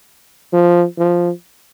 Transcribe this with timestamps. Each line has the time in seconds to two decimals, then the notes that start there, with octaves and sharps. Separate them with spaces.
0.53 F3
0.98 F3